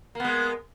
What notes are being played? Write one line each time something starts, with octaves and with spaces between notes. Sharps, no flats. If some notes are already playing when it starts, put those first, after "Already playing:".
G#3 A#3 B3